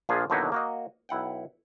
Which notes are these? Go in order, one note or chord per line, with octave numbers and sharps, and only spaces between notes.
A#1 A#2 F3 D4 G#4 F5
D#2 B2 D3 F#3 D#4 E4
A#3 F#4 D#5
B1 E4 F#5 G5